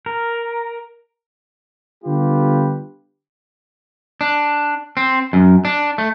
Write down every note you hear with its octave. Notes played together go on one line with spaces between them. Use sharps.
A#4
D3 G3 B3 F4 G4 B4
D4
C4
F#2
D4
A3